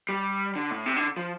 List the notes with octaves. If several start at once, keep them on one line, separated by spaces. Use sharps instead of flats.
G3
D3
A2
C3
D3
F3